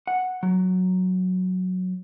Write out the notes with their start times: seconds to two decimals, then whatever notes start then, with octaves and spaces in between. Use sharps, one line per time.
0.07 F#5
0.43 F#3